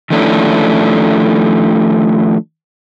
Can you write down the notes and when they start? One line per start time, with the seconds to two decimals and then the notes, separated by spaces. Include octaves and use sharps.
0.10 D#3 F3 A3 C#4 D4 E4